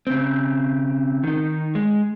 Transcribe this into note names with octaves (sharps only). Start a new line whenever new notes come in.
C#3 C4
D#3 D#4
G#3